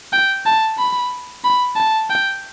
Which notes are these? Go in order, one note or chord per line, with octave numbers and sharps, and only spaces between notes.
G5
A5
B5
B5
A5
G5